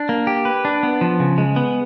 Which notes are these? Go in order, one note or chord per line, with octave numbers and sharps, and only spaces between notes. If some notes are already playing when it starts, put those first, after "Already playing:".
Already playing: D4
A#3
G4
B4
D4
B3
F3
C#3
G#3
B3